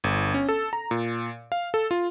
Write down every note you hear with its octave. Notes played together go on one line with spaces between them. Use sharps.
G1
C#4
A4
A#5
A#2
F5
A4
F4